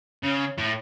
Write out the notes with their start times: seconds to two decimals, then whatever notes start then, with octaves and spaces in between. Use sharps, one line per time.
0.23 C#3
0.58 A2